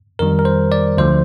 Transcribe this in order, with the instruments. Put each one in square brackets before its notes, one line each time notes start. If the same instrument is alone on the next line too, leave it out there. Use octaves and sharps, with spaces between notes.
[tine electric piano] F2 D#3 G3 A#4
A#4
C5
D5
D2 D3 F3 C5